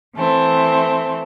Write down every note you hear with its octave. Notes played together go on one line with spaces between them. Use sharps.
E3 A3 C4